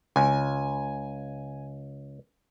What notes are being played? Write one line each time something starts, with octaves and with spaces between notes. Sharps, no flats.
C#2 G#5